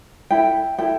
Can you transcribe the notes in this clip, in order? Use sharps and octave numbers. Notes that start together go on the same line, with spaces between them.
E4 A4 G5
E4 A4 G5